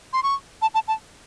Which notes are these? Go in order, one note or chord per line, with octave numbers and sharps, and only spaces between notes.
C6
C#6
A5
A5
A5